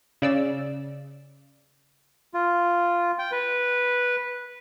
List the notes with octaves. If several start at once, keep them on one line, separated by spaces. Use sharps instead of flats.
C#3 D5 E6
F4
G5
B4